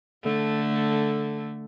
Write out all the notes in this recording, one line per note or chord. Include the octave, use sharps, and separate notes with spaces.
D3 A3